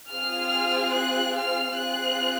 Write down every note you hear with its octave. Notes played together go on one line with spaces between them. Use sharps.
C4 F4 G#4 F6
F#6
F6
C4 F4 G#4 F#6